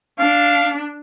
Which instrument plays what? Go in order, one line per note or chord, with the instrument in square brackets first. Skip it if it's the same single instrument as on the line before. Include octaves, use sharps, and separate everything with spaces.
[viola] D4 [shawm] F5